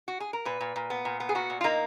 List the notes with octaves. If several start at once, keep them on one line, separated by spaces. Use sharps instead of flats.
F#4
G#4
A#4
A#2 B4
A#2
A#2
B3
A#2
B3
G#4
A#2 F#4
A#2
F4
A#3 D#4